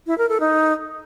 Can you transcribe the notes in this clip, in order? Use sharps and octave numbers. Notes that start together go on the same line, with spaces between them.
E4
A#4
A4
D#4